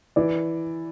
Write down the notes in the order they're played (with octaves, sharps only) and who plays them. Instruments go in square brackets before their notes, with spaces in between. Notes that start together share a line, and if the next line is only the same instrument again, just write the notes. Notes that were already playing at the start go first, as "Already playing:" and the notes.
[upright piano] E3 D5